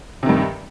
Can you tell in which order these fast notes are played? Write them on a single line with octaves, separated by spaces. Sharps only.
C3 D#3 G2